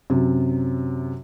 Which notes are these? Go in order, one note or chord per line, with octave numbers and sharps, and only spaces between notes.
F#2 C3